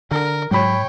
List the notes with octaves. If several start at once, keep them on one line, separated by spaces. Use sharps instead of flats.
D3 A#4
G#2 F#3 C#5 G5 B5